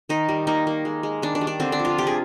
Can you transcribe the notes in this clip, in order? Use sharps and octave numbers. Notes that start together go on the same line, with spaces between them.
D#3 D#4
G3
A#3 D#4
A#3
G#3
G#3
D#3 D4
D4
G3
D4
D3 C4
D4
F3
F4
C3 G4
G#4